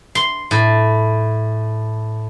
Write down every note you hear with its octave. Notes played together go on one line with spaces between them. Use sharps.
C6
A2